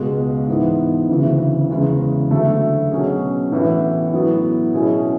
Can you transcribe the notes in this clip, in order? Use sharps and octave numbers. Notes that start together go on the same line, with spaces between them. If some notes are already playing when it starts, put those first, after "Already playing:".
Already playing: C#2 B2 G#3
G#2 E3 B3
D2 C#3 E3
E2 C#3 G#3
D2 D3 F#3 A3
B2 F#3 C#4 G#4
A2 E3 B3
A2 F#3 B3
B2 F#3 C#4 E4 G#4